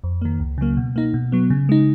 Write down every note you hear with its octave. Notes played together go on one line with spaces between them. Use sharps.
F2
D#3 A#3
C#2
C#3 F#3 A#3
B2
A#3 D#4
B2
F#3 B3
C#3
G#3 D#4